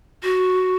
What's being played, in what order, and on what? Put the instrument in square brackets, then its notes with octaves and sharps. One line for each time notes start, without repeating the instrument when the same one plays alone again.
[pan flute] F#4